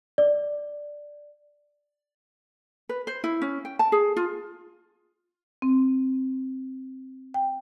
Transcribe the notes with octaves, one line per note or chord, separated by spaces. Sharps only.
D5
B4
C5
E4
C#4
G5
A5
G#4
F4
C4
G5